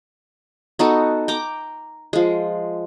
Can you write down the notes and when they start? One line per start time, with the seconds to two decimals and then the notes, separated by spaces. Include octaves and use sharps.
0.79 B3 D#4 F#4 A4
1.28 G5 A#5 D6
2.13 F3 G#3